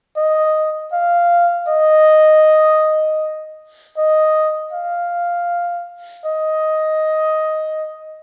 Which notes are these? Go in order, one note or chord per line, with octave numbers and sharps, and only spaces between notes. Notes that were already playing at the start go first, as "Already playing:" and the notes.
D#5
F5
D#5
D#5
F5
D#5